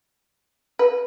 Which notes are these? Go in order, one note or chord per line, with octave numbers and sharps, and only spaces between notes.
B4